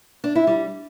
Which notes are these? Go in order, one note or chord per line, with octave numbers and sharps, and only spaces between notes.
D4
E4
G3